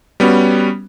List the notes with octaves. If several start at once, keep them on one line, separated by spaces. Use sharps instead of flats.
G3 B3 C#4 F#4